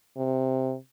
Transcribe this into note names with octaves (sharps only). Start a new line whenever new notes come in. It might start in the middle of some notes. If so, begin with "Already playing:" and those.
C3